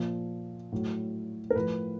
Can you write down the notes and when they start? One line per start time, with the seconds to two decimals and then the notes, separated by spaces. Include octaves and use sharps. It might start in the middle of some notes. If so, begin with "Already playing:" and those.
Already playing: A#2 F3
0.72 A2 F#3
1.50 A#4
1.55 A2 F3 B4